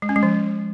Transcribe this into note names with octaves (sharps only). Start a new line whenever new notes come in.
G#3
C#4
G#3
F3